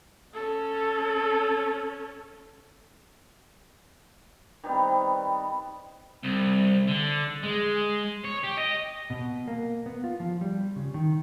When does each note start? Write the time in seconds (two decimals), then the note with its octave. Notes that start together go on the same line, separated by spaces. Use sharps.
0.34 C#4 A4
4.64 D#3 G3 B3 C4
6.24 C2
6.87 D3
7.43 G#3
8.25 C#5
8.44 G4
8.58 D#5
9.10 B2
9.48 A#3
9.86 B3
10.04 F4
10.20 F3
10.41 G3
10.76 C#3
10.94 D#3